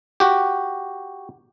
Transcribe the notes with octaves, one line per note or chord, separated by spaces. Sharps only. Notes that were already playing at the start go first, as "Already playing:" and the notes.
F#4 G4